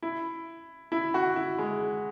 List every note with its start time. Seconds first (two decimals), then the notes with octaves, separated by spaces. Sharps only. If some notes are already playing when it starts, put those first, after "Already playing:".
0.02 E4
0.92 E4
1.14 F#4
1.36 E4
1.58 G#3